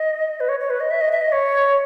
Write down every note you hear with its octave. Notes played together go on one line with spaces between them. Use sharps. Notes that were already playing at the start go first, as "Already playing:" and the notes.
Already playing: D#5
B4
C#5
C#5
B4
D#5
E5
D#5
E5
D#5
C#5